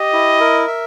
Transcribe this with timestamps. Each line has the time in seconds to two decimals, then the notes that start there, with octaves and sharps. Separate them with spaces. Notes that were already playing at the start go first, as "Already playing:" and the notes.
Already playing: G4 D#5
0.13 E4
0.40 A#4
0.67 E5